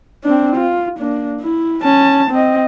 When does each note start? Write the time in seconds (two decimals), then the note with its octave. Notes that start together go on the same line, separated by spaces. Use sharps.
0.24 C4 D4
0.56 F4
0.99 A#3 D4
1.41 E4
1.83 C#4 A5
2.31 C4 D#5